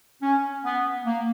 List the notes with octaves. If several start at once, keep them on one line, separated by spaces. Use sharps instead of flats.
C#4
B3
A#3